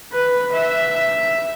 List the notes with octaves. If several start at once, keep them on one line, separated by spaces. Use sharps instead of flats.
B4
E5